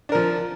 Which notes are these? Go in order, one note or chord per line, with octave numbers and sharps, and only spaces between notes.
F3 D4 A#4